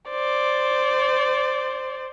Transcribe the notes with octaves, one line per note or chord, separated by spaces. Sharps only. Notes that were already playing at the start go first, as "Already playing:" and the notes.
C5 D5